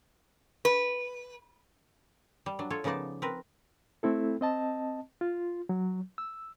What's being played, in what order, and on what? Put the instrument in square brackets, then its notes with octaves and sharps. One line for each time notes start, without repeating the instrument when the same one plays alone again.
[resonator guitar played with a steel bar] B4
[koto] G3
F#3 D4
F4 A4 C#5
C#3 F3 B3 D#4 D5 A5
C4 A#4 B4
[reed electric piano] A3 C4 E4 A4
C4 D#5 A5
F4
F#3
E6